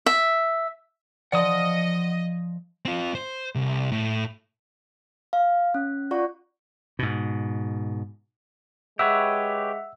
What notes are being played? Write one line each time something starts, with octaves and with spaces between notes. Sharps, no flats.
E5
F3 D5 D#5 F#5 D#6
C4 F4
C5
C2
A2
F5
C#4
F4 D5 F#5 C#6
G#2 B2
G#3 G4 B4 C#5 E5 F#5 E6